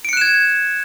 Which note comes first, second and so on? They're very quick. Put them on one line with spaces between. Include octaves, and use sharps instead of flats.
D7 C#7 F#6 E7 G#6